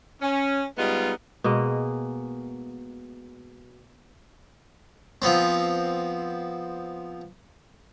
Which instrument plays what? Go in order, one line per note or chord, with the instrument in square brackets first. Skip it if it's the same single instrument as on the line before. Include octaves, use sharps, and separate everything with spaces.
[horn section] C#4
G3 G#3 B3 D#4 F4
[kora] B2 G#3 A#3 D#5
[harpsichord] F3 B3 C4